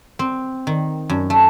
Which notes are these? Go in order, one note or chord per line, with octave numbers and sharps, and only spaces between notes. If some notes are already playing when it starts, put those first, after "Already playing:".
C4
D#3
F#2
A3